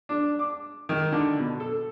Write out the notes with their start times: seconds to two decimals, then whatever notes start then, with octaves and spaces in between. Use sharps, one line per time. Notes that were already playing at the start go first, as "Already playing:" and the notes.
0.09 D4
0.39 D6
0.89 D#3
1.12 D3
1.39 B2
1.60 A4